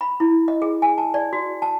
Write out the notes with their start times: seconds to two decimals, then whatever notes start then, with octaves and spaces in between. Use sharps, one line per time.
0.01 B5
0.20 E4
0.48 D#5
0.62 G#4
0.82 G#5
0.98 A5
1.14 D5
1.33 F#4
1.62 A5